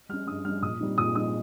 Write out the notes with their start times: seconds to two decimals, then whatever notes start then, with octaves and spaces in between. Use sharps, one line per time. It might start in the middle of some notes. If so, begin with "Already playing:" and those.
0.09 G3 F6
0.13 C#4
0.27 G2 D#6
0.45 G3 F6
0.48 C#4
0.62 A#2 D#6
0.80 G3 C4 D#4
0.98 A#2 D#6
1.15 G3 C4 D#4 D#6